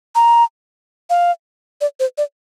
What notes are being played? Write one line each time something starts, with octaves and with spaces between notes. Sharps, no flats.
A#5
F5
D5
C5
D5